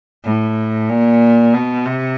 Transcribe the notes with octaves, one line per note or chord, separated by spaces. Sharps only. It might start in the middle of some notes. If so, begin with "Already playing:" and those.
A2
A#2
B2
C3